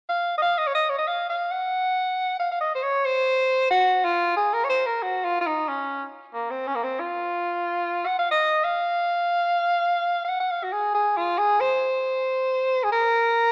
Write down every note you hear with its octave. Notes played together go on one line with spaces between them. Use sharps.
F5
D#5
F5
D#5
C#5
D#5
C#5
D#5
F5
F5
F#5
F5
F5
D#5
C5
C#5
C5
F#4
F4
G#4
A#4
C#5
C5
A#4
F#4
F4
F4
D#4
C#4
A#3
C4
C#4
A#3
C4
F4
F#5
F5
D#5
F5
F5
F#5
F#5
F5
F#4
G#4
G#4
F4
G#4
C5
G#4
A#4